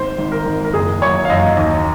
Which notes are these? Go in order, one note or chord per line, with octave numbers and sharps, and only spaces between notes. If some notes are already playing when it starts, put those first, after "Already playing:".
Already playing: G#1 C5
G#1
A#4
G#1
A#4
F#1 G#4
F#2 C#5
F5
F#2 D#5
D#2